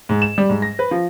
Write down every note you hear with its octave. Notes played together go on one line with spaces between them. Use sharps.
G#2
E7
G3
G#2
A#6
B4
F3